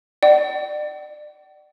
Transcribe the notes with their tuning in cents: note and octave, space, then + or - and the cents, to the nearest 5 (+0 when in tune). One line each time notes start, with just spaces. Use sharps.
D5 +30 F#5 +45